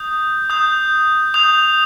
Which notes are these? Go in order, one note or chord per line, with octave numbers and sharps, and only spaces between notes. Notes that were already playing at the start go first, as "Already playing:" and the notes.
Already playing: D#6 G6
D#6 G6
D#6 G6 F7